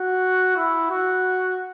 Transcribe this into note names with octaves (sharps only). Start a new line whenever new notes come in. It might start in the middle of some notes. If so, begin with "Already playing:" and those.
Already playing: F#4
E4
F#4